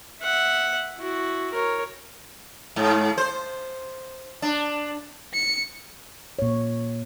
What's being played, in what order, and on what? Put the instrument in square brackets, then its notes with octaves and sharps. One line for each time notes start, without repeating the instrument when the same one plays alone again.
[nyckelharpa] E5 F#5
E4 F#4
A#4 C#5
[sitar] G#2
C5
D4
[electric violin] C#7
[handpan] A#2 C#5